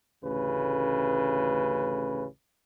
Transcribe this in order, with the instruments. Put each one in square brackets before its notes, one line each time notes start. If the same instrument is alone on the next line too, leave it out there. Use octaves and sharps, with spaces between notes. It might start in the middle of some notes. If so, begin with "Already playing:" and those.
[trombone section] A1 D2 C#3 B4